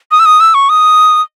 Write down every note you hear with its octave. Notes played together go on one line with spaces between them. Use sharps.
D#6
E6
D#6
E6
C#6
D#6